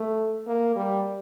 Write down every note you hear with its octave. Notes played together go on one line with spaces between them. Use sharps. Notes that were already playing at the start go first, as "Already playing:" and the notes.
Already playing: A3
A#3
G3